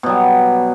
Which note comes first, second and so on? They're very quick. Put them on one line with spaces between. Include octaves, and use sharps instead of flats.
B2 F#3 G3